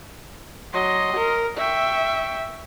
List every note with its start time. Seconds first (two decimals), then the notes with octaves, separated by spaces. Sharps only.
0.73 F#3 D#5 C6
1.16 A#4
1.57 E5 G5 C#6